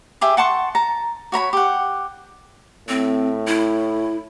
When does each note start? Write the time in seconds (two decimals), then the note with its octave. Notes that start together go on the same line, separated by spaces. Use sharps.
0.21 G4 G#4 E5
0.37 F#5 A5 C6 C#6
0.75 A5 A#5
1.32 F#4 C#5 A#5 B5
1.53 G4 F#5
2.89 A2 C4
3.47 E4